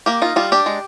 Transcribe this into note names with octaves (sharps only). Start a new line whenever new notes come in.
A#3 G4
D#4 F4
G3 F4
D4 G4
G#3